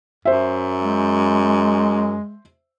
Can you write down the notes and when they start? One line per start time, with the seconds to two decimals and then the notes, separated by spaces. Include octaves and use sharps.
0.25 F#2 C5 E5
0.81 G#3